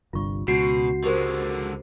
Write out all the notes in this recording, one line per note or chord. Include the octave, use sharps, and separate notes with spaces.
G1 C2 G2 F4 C#6
C#2 B2 F#4 C7
D3 G#3 G4 A#4 C5